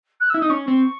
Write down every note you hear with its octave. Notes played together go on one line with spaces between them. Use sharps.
F#6
E4 E6
D#4 D#6
C#4 C#6
C4